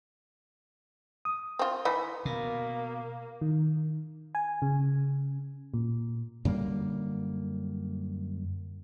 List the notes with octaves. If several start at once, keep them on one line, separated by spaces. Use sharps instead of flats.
D#6
C4 F4
E3 D#4 B5
B2 A#3
D#3
G#5
C#3
A#2
F#2 D3 G3 A#3